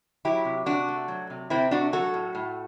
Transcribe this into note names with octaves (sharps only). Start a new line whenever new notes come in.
F#3 E4 G4
C3
C3 D4 F#4
A3
F#3
C3
C3 C4 E4
A3 D4 F#4
F#3 F#4 A4
A2
A2